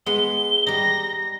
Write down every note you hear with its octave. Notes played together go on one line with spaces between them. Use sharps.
G#3 B3 G7
G3 D#4 A#6